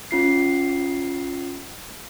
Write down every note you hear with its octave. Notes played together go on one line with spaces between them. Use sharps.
C#4 F4 C7